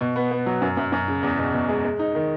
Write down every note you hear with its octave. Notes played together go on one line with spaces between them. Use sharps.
B2
B3
B3
F#3
F#2
F#2
F#2
C#3
E2
B2
B2
G#3
G#3
D#4
D#3